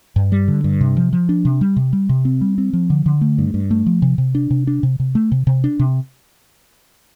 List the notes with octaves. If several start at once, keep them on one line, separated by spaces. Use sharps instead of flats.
G2
G3
D3
G2
C3
F3
F3
D4
C3
G3
C3
G3
C3
C4
G3
C4
F3
D3
D3
A3
G2
G2
A3
F3
C3
C3
D4
C3
D4
C3
C3
A3
C3
C3
D4
C3